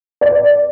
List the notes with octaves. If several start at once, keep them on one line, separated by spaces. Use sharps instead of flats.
D5